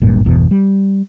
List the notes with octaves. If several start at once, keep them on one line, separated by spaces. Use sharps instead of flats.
D1 G#1 G2 A#2
G1 E2 B2
G3